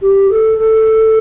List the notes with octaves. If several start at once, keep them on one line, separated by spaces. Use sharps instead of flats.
G4
A4
A4